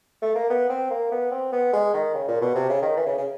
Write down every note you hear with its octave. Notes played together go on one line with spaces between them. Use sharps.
A3
A#3
B3
C4
A#3
B3
C4
B3
G#3
D#3
C#3
A#2
B2
C3
C#3
D#3
E3
C#3
C#3